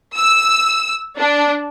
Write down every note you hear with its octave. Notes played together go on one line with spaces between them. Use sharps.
E6
D4